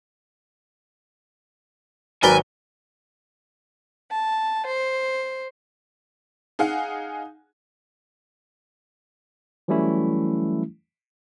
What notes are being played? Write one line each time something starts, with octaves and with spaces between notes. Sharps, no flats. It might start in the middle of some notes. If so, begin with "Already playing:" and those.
G#1 F#3 A#4 B4 D5 G#5 G7
A5
C5
D#4 G#4 F5 F#5 G#5
E3 F#3 G3 A3 C#4 E4